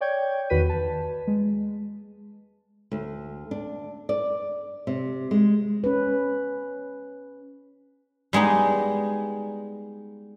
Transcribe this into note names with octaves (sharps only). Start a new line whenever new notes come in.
C#5 D5 G5 C#6 G6 G#6
E2 D#3 F#4 B4 B6 D#7
B4 A5
G#3
D2
D4
D5
C3
G#3
C#4 B4
G3 G#3 B3 D#4 D#5